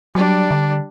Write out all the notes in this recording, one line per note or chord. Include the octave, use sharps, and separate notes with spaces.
F#3 G3 D4
D3